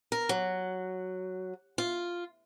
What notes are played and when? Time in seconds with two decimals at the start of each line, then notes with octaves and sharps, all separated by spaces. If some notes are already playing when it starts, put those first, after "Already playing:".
0.12 A#4
0.29 F#3
1.78 F4